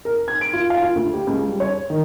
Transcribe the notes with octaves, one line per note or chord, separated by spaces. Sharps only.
A#4
G#6
D7
F4
F5
F4
D2
G4
C#2
G3
C#5
D#3